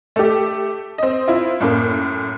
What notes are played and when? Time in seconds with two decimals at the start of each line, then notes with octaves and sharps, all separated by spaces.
0.16 A3 G4
0.98 C4 D#5
1.28 C4 E4 F4
1.60 F#2 A2 A#3